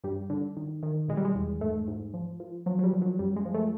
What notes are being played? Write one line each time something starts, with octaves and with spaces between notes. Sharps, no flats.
G2 G3
D3
D#3
D#3
B2 G#3
G3
G#3
E2
G#2 A3
G#2
F3
F3
F3 F#3
F#3
G3
F3
F#3
F#2 G3
G#3
F3
A3